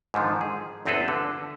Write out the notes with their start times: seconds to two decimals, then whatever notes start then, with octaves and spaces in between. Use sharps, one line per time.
0.14 G#2 D3 D#3 F3
0.41 G#4
0.85 G1 E2 C4 G#4 A4 B4
1.08 D3